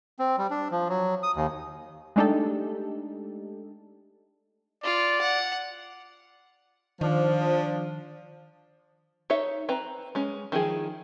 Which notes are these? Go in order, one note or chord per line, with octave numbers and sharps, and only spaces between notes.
C4
G3
D4
F3
F#3
D#6
D#2
G#3 A3 D4 D#4 G4 A4
F4 D5
F#5
D#3 F3 D4
D#4 A4 C#5 E5
C4 B4 A#5
G#3 C#4
D#3 F3 E4 G#4